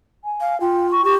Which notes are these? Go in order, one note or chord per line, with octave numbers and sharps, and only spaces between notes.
G#5
F5
F4 G5
C#6
G4 C#6